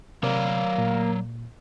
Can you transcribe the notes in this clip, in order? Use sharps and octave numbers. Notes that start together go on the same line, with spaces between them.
C3 F#3 A#3 C#5 D5
A#2